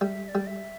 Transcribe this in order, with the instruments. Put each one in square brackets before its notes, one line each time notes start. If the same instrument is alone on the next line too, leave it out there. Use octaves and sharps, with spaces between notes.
[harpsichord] G3 [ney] E5
[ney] E5
D5
[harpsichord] G3
[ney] E5